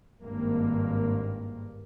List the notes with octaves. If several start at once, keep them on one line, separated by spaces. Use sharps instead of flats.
G#1 G2 A#3